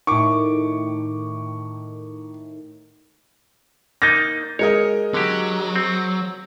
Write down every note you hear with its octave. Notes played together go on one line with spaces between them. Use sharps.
A2 D#3 C#6 D6
A#3 D#4 G6 A6 A#6
G#3 A#4 C#5 D#5
D3 F#3 G4
C4